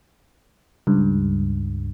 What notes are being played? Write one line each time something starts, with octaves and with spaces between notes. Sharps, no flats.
C#2 G2